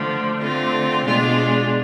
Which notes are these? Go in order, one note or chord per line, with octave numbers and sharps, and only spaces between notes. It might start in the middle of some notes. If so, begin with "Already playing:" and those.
Already playing: D3 F3 A3
D3 A3 C4 F4
B2 G#3 D4 F4